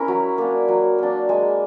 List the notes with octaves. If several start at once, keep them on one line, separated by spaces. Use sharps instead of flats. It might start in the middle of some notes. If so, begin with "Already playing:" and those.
Already playing: C#4 E4 A#4
F#3
A#3 D4
F#3
A#3 D4
G#3